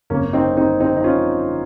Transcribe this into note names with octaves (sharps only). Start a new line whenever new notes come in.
G#1 F#2 C#3 A#3 C#4
C4 D#4
C4 D#4
C4 D#4
D#4
C#4 F4